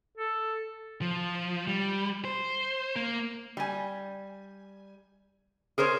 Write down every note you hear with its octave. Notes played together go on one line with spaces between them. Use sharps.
A4
F3
G3
C5
A#3
G3 G#5
G#4 A#4 C5 C#5